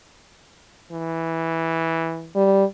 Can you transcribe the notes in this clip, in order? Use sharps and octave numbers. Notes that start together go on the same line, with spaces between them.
E3
G3